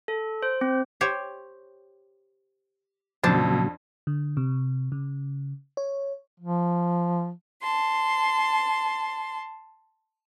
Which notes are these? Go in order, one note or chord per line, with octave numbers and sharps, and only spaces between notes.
A4
C5
C4
G4 C5 C#5
F2 A#2 C#3 F#3 D4 C5 A5
D3
C3
C#3
C#5
F3
A5 C6